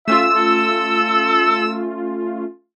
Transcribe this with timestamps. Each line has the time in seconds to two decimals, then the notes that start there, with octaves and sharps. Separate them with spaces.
0.08 A3 C#4 F4 E5 E6
0.35 A4